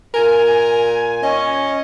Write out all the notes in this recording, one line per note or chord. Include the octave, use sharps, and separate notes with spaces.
A#2 A#4 G#5
C#4 D#5